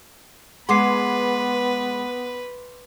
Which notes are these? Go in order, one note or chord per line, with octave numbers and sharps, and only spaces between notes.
G#3 B3 G#4 B4 F#5 C6 D6 C7